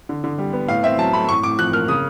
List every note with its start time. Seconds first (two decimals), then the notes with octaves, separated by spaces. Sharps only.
0.09 D3
0.24 D3
0.38 G3
0.53 B3
0.68 A2 F5
0.83 C4 E5
0.98 F#3 A5
1.13 A3 B5
1.29 A2 C#6
1.43 A2 D6
1.59 F3 F#6
1.73 A#3 F6
1.88 C#3 D#6